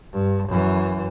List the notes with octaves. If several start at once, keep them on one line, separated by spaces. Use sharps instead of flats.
G2
F#2 E3